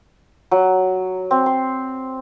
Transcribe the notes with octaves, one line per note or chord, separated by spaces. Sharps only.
F#3
C4
C6